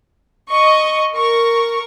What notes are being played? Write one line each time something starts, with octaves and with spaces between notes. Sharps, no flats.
D#5 C#6
A#4 C#6